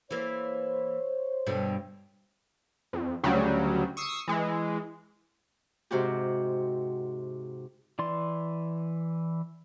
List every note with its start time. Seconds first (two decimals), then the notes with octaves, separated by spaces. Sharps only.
0.11 E3 A#3 C5 C#5
1.47 G2 B2 D3
2.93 F2
3.23 D2 C#3 F#3 G3
3.97 C#6 D#6 E6 C7
4.28 E3 G#3
5.91 G#2 C3 F#4 G4
7.99 E3 D5 C6